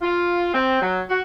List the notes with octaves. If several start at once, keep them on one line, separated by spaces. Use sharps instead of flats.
F4
C4
F#3
F#4